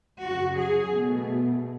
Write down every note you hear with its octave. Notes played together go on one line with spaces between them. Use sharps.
F#2 C#3 F#3 F#4
G#4
B2 A3